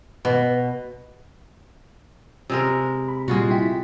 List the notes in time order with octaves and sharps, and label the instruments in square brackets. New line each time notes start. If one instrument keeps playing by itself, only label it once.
[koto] B2
[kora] C3 G#3 A#4
[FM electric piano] B5
[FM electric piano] A#2 G3 [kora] G#3 F4 F#4
[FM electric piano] E4 G5 B6